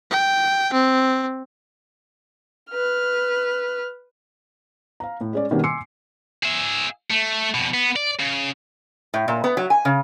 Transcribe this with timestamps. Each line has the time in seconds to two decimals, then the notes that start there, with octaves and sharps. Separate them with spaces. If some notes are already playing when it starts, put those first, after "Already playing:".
0.10 G5
0.73 C4
2.71 B4 F6
5.00 F5 A#5
5.21 A2
5.33 G#3 C#4 D5
5.51 B2 D#3 G3 A#3 C4 C#4
5.64 G#5 C6 D6 E6 C7 C#7
6.43 G#4 E5
7.11 A3
7.54 F2 B2
7.74 B3
7.96 D5
8.19 C#3
9.14 A2
9.28 A#2
9.44 B3
9.57 F#3
9.70 G#5
9.85 C#3